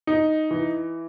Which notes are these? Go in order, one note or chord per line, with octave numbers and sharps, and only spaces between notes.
D#4
E3